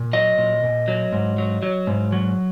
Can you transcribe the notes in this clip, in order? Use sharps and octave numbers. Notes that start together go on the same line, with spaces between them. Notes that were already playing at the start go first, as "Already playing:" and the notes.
Already playing: A#2
F#3 D#5
A#2
A#2
F#3
G#2
F#3
F#3
G#2
F#3